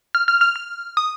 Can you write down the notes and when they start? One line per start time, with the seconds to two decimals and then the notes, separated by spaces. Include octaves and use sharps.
0.15 F6
0.28 F6
0.41 F6
0.56 F6
0.97 D#6